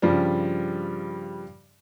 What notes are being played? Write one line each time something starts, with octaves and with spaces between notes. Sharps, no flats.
G2 C#3 F3 G3